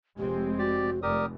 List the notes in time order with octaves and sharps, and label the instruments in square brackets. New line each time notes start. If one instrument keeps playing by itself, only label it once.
[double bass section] F1 G#3 C4 [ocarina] G4
[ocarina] F#4 [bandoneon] G4 D5
[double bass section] F1 [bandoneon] G4 A#4 D#6 [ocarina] D5